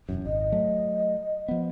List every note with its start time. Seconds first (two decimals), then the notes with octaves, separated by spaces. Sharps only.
0.09 E1 F#2
0.25 G#1 D#5
0.52 F#3 A3
1.48 F3 B3